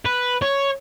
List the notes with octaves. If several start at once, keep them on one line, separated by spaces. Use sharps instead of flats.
B4
C#5